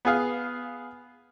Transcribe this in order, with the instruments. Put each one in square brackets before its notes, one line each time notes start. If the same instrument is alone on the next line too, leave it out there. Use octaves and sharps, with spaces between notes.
[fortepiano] B3 G#4 F5